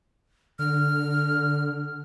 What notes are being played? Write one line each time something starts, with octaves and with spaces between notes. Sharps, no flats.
D3 F6